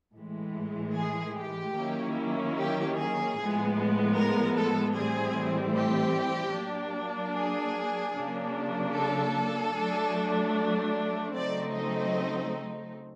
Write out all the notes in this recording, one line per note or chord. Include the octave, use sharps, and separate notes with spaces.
A2 E3 G#3
G#4
G4
D#3 F#3 A#3 C#4 E4
G4
G#4
A2 F3 G#3 B3
A#4
A4
A2 E3 G3 C4 G#4
G4
F#3 A#3 D4
G#4
C#3 F#3 A#3 D4
A4
F#3 A3 D4
C#3 F#3 A3 C4 D#4 D5
D#5